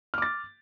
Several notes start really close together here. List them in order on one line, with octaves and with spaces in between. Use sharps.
F6 D6 A6